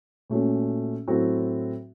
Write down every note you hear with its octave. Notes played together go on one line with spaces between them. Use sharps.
A#2 A3 C#4 F#4
A2 F#3 C4 F#4 A4